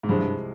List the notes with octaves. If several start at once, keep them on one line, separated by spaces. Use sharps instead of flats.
G#2
C2 G2 C3 F3 G#3
G2